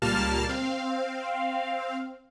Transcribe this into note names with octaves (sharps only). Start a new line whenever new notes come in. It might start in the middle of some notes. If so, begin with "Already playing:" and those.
C#2 A#2 G3 A#3 A5 F6
C4 F5